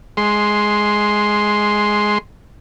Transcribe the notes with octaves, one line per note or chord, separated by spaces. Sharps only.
G#3 C6